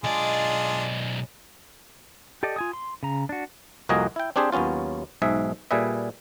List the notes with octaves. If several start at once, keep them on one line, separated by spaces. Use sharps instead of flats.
B1 G#3 D4 F4 G#4 D5
G4 A4 D5 D#5
F4 G#5 D#6
C6
C#3 A#5
D4 F#4
C2 F2 A#3 F#4 D#5 G#5
E4 G5
C4 D4 G4 G#4 C5
D#2 F#3 B3 C#4 F4
B1 G#2 G#4 E5
A#2 G3 G#4 B4 E5